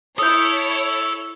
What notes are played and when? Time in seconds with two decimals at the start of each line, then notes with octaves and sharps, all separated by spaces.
0.18 E4 A4 C#5 D#6 G6